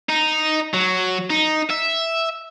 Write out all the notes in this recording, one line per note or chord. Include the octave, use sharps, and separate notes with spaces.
D#4
F#3
D#4
E5